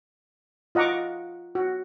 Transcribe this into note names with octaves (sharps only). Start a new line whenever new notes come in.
F4 D#5 F#5 A#5 C#6 D6
F#4